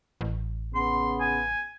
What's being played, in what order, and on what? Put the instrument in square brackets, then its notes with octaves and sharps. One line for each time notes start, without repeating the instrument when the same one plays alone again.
[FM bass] A1
[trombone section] C#3 B3 [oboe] C6
[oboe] G#5